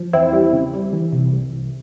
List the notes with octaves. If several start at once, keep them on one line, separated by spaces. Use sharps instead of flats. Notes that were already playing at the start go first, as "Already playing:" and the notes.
Already playing: F3
E2 C4 E4
G3
C#3
G3
E3
C3
C2
C2